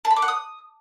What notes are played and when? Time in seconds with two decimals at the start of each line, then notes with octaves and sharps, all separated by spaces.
0.05 A5
0.11 B5
0.16 D6
0.22 F#5
0.28 D#6